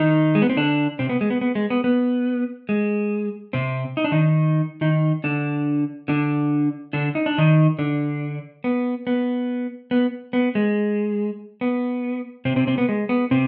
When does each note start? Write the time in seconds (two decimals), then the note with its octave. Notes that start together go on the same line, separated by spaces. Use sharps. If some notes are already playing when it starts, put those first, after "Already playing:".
Already playing: D#3 D#4
0.35 G#3
0.42 B3
0.49 C4
0.57 D3 D4
0.99 C3 C4
1.09 B3
1.21 G#3
1.30 B3
1.41 B3
1.55 G#3
1.70 B3
1.84 B3
2.69 G#3
3.53 C3 C4
3.97 D#4
4.04 D4
4.12 D#3 D#4
4.81 D#3 D#4
5.24 D3 D4
6.08 D3 D4
6.93 D3 D4
7.15 D#4
7.26 D4
7.38 D#3 D#4
7.79 D3 D4
8.64 B3
9.07 B3
9.91 B3
10.33 B3
10.55 G#3
11.61 B3
12.45 C3 C4
12.56 C3 C4
12.67 C3 C4
12.78 B3
12.89 G#3
13.09 B3
13.31 C3 C4